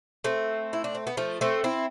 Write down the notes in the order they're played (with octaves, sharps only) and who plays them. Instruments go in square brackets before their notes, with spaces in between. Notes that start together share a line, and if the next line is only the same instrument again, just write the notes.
[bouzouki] A3 C4
E4
D4
C4
B3
F3 A3
A3 C4
C4 E4